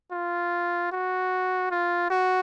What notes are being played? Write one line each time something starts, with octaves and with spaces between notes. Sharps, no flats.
F4
F#4
F4
F#4